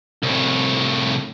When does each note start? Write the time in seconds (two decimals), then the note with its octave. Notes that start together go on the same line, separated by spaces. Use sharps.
0.23 C2 A2